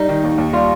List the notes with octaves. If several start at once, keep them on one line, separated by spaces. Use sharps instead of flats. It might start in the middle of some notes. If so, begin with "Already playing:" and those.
Already playing: G3 D#4
D#3
D#2
D#2
G3 F4